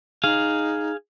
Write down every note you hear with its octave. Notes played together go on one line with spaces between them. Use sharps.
D#4 G#4 F5